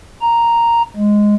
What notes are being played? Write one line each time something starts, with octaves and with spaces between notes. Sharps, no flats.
A#5
G#3